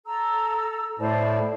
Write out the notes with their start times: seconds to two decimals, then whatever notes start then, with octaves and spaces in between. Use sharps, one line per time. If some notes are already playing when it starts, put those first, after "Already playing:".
0.06 A4 A#5 E6
0.99 A2 C5 D5 A5